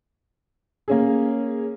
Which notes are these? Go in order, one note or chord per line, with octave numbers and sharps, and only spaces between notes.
A#3 C#4 G#4